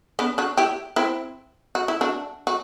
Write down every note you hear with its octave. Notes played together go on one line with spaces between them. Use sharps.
B3 D4
D4 F#4
E4 G4
C4 E4
F#4
E4
D4 F#4
F#4